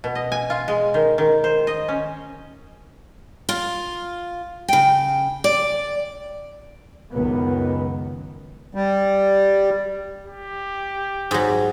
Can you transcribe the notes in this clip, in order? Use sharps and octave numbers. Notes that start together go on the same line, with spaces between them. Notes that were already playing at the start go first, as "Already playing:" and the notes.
B2
D#5
G#5
F4
G#3
D#3
D#3
C5
D#5
C#4
F4
C#3 G5
D5
C#2 F#2 D#3 B3
G3
G4
G#2 F#3